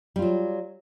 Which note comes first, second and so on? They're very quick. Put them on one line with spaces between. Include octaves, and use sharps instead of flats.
G3 F4 F#3